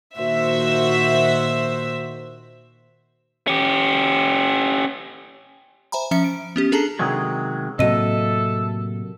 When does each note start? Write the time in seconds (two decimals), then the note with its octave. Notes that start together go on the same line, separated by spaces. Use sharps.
0.17 A#2 D#3 F#4 C5 E5 E6
3.48 C#4 G4
5.92 C5 E5 G#5 A#5 B5
6.11 F3 C#4 E5 A#5 C#7
6.24 D7
6.56 B3 C#4 G4
6.72 D4 G#4 A4 A5 A#5
6.99 C3 D#3 F#3 G#3
7.79 A2 C3 F#3 A#3 A4 D#5 E5 D#7